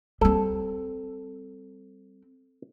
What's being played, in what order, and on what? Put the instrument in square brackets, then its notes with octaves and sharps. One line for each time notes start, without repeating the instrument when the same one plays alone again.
[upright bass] G3 C4 [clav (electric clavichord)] A4